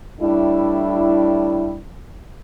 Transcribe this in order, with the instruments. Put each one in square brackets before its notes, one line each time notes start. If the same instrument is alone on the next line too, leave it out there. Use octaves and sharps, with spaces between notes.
[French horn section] A2 G3 D4 E4